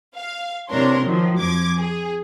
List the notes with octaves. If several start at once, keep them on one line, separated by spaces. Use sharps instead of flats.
F5
C3 E3 D4 A#4 C#5 C6
D#3 F3 F#3
F2 F3 D6 G#6
G#4